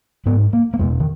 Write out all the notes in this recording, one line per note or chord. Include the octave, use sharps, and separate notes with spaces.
G#2 B3
A#3
A#3
E2 B2 G#3
D#3